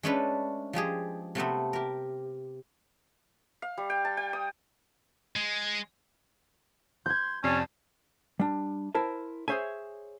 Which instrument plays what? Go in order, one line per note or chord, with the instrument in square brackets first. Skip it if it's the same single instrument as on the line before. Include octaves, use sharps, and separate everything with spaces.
[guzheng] G#3 A3 C#4 D4 A4 B4
F3 G#3 G4 G#4
C3 A3 B3 C4
G4 A#4
[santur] F5
G3
G5
A5
G5
D#6
[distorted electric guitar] G#3
[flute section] C6 [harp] G6 G#6
[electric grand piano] F2 C3 C7 [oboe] C#4 [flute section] D5 A5
[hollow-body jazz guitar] G3 D4
E4 A#4 C5 A5
G#4 A4 C5 C#5 E5 G#5